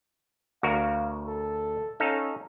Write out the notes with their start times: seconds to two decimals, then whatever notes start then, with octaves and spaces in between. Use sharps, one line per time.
0.63 D2 F#4 A#4 F5
1.26 A4
2.00 C#4 D#4 A4 F5